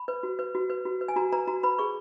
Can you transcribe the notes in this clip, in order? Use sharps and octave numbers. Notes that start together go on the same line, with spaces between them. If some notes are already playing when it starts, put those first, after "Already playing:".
Already playing: B5
B4
F#4
B4
F#4
B4
F#4
B4
G#5
F#4 A#5
B4 A#5
F#4 A#5
B4 B5
G#4 C#6